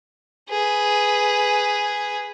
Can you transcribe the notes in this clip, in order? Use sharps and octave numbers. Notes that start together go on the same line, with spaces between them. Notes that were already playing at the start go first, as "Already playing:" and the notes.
G#4 B4